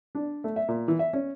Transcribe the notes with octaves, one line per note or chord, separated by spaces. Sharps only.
D4
A3
E5
A#2
E3
E5
C#4